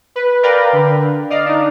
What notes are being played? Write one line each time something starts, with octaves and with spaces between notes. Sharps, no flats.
B4
A#4 B4 D5 F5 G5 A#5
D3
D5 D#5 F5
D4 D#4